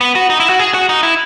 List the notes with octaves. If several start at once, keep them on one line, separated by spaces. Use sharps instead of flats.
B3
F#4
D#4
E4
F#4
G#4
F#4
D#4
E4